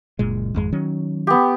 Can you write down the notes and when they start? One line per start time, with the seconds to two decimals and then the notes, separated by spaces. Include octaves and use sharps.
0.19 F#1 A#2 G#3
0.54 G#1 F2 G#3
0.72 D#3 F#3 C#4
1.27 B3 G4